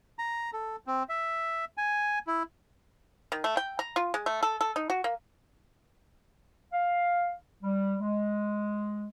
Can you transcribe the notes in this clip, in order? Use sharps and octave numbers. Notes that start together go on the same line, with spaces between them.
A#5
A4
C4
E5
G#5
E4
D#3
A3
G5
A#5
F4
G#3
A3
A4
A4
D#4
F#4
A#3
F5
G3
G#3